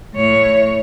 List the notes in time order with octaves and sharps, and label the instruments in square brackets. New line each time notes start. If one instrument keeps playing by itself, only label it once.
[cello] A2 C#5